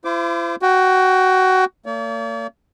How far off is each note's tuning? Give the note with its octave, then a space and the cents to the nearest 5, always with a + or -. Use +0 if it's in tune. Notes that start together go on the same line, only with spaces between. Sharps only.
E4 +45 C5 -25 D6 +0
F#4 +15 G5 +0
A#3 -45 D5 -45